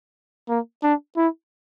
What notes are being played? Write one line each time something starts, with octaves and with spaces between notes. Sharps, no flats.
A#3
D4
E4